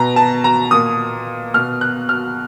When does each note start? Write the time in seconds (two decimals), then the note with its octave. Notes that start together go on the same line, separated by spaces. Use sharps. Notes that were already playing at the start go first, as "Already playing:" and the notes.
Already playing: B2 A#5
0.16 A5
0.44 A#5
0.71 A#2 D#6
1.54 B2 F6
1.81 F#6
2.09 F6